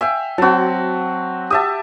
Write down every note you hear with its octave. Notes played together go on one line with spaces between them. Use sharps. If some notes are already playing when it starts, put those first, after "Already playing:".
E5 F5 G5 G#5
F#3 C4 F#4 A5
G4 E5 A5 D#6